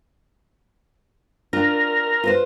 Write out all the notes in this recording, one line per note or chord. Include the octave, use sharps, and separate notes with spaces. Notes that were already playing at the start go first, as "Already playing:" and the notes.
D4 F4 A#4 D5
F4 B4 C5